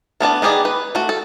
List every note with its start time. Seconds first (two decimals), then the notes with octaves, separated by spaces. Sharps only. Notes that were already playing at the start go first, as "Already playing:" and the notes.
0.20 A3 B3 D4 A5
0.42 D#3 B3 G4 G#4 D5
0.65 B4
0.95 A3 F#4
1.09 A4